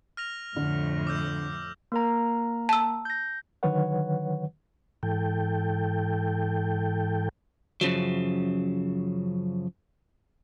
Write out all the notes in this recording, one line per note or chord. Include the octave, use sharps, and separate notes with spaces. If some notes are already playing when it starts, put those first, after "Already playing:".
F6 A#6 F7
F2 A2 D3
D6 E6 G6
A#3 A#4 A#5
A5 E6
G6 A#6
D3 D#3 F#3 B4 C#5 F#5
G#2 E3 A4 G5
F#2 C#3 F3 F#3